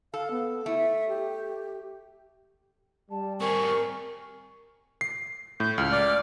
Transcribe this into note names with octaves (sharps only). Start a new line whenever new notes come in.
A4 F5
B3
A3 E4
E5
G4
G3 A5
C4 G#4 A#4 C#6
C7
A2 G6
C#2 F6
D5